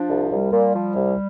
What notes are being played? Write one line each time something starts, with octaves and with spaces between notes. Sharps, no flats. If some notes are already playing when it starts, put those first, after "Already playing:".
Already playing: F3 D4
C2
C2 G3
A#2
F3
C2